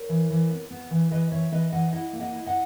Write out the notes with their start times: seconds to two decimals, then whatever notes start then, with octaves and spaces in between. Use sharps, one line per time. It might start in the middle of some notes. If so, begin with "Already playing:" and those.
Already playing: A#4 C#5
0.09 E3
0.30 E3
0.50 B3
0.70 B3
0.91 E3
1.11 E3 B4 D#5
1.32 E3 C#5 E5
1.52 E3 B4 D#5
1.72 E3 D#5 F#5
1.93 E4 D#5 F#5
2.13 A#3
2.19 D#5 F#5
2.33 E4
2.46 D#5 F#5